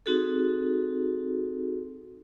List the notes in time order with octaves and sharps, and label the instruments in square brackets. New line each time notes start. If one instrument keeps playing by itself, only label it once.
[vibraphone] C4 D#4 F#4 G#4 A4